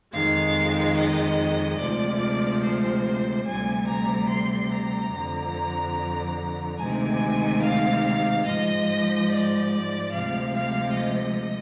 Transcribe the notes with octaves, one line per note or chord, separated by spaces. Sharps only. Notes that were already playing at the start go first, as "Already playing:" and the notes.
F2 D#3 G#3 F5
D#5
D2 C3 F3 G#3 D5
C5
D2 C3 G3 G#5
A#5
C6
A#5
F2 D3 F3
D2 C3 D#3 G#3 G#5
F5
F5
G#2 F3 G#3 D#5
D5
D2 C3 F3 G#3 F5
F5
D#5